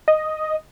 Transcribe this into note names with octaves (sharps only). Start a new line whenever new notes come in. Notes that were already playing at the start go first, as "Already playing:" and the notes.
D#5